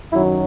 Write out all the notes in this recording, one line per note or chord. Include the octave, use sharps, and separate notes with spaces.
F#2 D#3 F#3 E4